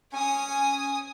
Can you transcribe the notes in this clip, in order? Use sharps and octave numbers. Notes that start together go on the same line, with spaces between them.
C#4 G#5 D#6